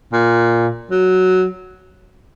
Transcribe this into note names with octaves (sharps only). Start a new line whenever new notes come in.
A#2
F#3